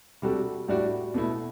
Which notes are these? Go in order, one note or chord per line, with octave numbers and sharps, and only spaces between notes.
C3 G3 D4 F#4 A4
A2 G3 D4 F#4
B2 A3 E4